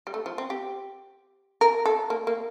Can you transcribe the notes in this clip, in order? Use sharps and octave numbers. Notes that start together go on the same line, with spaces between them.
G3
A3
F3
C4
G4
A#4
A4
A#3
A#3